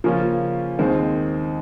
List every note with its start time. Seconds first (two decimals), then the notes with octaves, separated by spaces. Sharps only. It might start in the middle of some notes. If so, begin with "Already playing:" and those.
0.04 C#3 F3 A#3 C#4 F4
0.79 D#2 D#3 G#3 C4